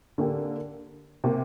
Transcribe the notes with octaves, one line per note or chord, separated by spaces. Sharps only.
D3 A#3 G4
C3 A#3